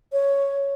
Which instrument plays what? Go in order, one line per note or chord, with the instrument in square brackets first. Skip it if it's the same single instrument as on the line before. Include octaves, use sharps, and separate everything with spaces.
[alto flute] C#5